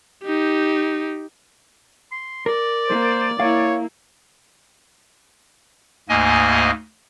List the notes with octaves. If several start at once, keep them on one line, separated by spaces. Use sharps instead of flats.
D#4 G4
C6
A#4 D5
A#3 C5
A#3 E4 C#5 F5
D2 G#2 A#3 D#5 G#5